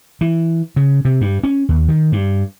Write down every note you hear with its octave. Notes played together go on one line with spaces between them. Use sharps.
E3
C#3
C3
G2
C#4
D#2
D#3
G2